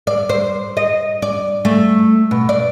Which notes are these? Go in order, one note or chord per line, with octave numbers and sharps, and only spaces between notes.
D5
C5
D#5
D5
A3
B2
D5